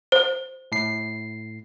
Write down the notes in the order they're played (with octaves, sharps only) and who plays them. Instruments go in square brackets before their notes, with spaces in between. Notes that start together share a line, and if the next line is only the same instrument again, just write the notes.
[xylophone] C5
[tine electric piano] A2 C7